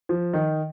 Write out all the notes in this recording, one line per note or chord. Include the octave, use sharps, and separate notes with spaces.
F3
D#3